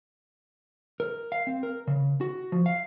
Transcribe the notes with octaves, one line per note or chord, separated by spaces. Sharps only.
A#4
F5
C4
A#4
C#3
F#4
F3
F5